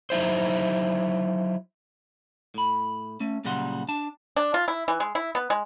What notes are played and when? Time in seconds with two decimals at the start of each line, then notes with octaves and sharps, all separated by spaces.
0.10 F#3 D#4 E4 C5
2.54 A2 B5
3.20 A3 C#4
3.45 A#2 C#3 F#3 G3 F#5 C6
3.89 D4 A5
4.36 D4
4.54 F4
4.68 E4
4.88 E3
5.00 G#3
5.15 E4
5.35 B3
5.50 G#3